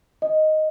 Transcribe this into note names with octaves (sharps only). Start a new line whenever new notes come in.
D#5